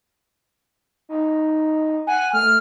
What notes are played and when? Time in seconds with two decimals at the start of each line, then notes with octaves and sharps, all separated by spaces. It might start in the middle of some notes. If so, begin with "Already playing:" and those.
1.09 D#4
2.07 F#5 G#5
2.33 A3 F6